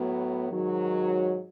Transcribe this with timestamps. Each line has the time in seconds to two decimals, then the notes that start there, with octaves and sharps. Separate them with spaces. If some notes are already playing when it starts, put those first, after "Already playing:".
Already playing: A2 F#3 B3
0.50 G#2 D#3 F#3